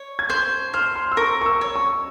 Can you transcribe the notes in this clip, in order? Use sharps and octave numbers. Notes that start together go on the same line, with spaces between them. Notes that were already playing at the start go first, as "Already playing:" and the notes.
Already playing: C#5
G#6
C5 G6
C5 F6
C6
E6
A#4 C#6
C#6
E6
C#5
C#6